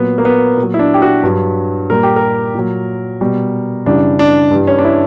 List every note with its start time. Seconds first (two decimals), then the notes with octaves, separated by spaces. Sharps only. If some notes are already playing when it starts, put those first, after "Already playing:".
Already playing: A#2 F#3 B3
0.18 A#3
0.25 B3
0.57 A#2
0.63 F#3
0.74 E4
0.79 D4
0.94 G4
1.02 F#4
1.23 G2 F#3
1.90 A#2 G3 A#4
2.03 G4
2.16 A#4
2.55 A#2 F#3
3.21 B2 G3
3.86 F#2 C#3 E3 G3 D4
4.19 D4
4.51 G2 E3 G3
4.67 C#4
4.78 D4
4.85 E4